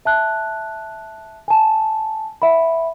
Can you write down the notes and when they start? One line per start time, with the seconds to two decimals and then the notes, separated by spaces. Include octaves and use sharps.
0.05 E5 A5 F#6
1.48 G#5 A5
2.42 E5 F#5 B5